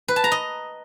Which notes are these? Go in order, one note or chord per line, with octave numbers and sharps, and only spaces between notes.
B4
A5
A#5
D#5